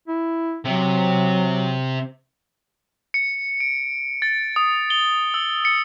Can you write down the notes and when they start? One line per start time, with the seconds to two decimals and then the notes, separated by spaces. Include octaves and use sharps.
0.08 E4
0.65 C3 F#3
3.14 C#7
3.60 D7
4.22 A6
4.56 D#6
4.90 G7
5.34 E6
5.65 C#7